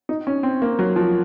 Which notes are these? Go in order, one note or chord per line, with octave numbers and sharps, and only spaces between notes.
D#4
C#4
C4
A#3
F#3
F3